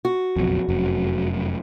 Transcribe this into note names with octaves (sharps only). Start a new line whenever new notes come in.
F#4
F#1 B1 F2
F1 F#2